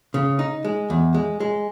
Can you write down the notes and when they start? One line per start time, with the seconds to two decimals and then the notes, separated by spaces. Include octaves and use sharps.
0.14 C#3
0.39 D#4
0.65 G#3
0.90 E2
1.14 G#3
1.40 G#3